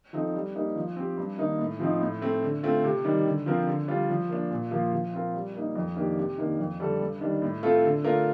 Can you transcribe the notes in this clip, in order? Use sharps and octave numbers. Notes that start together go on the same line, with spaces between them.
F3 C4 D#4 A4
G3
A#3 D#4 G4
F3
C4 G4
G2
D#3 A#3 D#4
A2
F3 C4 D#4
A2
A3 C4
D3
A3 C4 F4
C3
D#3 G3
D3
F3 C4 F4 A#4
D3
G3 D4 F4
F3
A#3 D4
A#2
F3 A#3 F4
F3
C4 F4 A#4
G3
A#3 D#4
F2
D#3 A#3 D4 G4
C3
D#3 A#3 D4
F2
D3 G3 D4 A4
G2
D#3 G3 D4
A2
A3 C4 F4 A4
D3
A3 D4 F4 A#4